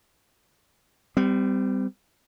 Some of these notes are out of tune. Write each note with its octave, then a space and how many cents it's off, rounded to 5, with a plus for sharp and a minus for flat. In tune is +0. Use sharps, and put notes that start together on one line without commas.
G3 +0 C4 -35